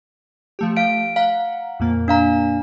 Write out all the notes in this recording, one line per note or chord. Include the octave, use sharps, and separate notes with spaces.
F3 A3 G4
F5 D7
F5 F#5 A#5
F2 A#2 A#3
D4 F5 A#5